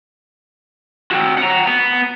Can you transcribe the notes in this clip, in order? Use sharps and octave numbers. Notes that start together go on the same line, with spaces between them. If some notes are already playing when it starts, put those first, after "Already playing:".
C4 F#4
F#5 A#5
B3